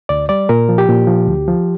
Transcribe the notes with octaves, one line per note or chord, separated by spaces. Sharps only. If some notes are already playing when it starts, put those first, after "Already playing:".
D2 D5
G3 D5
A#2 A#4
F3
G4
A#2
F3
D2
F3